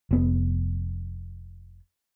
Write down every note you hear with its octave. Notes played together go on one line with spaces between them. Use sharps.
F1 B3